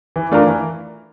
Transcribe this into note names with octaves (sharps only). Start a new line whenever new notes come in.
E3
A3 D4 F4 A#4
E3